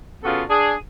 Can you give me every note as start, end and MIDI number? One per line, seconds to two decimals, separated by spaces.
0.23 0.43 49
0.23 0.43 59
0.23 0.43 65
0.23 0.43 66
0.23 0.43 69
0.50 0.73 62
0.50 0.73 68